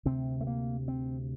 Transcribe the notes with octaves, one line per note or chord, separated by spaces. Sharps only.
D2 C3 C4
A3
A#3
C4